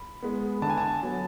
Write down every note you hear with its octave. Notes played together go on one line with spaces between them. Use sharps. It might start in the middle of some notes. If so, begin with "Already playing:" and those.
Already playing: B5
G#3 B3
D3 A5
G#5
A5
F#3 B3